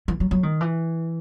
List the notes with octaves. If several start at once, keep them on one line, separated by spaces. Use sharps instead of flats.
E3
F#3
F#3
D#3
E3